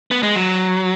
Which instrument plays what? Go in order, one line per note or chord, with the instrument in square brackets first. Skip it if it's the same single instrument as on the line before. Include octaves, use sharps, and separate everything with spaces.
[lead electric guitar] B3
G#3
F#3